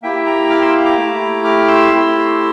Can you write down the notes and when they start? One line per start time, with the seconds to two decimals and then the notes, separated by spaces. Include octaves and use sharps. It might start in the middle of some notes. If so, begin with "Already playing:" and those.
0.02 A#3 E4 G4 E5 G5
0.26 G5 A#5
0.50 D6 F6
0.62 C6 E6
0.85 A#5 D6
0.98 A3 E4 G4
1.44 D6 F6
1.68 C6 E6
1.92 A3 C4 E4 G4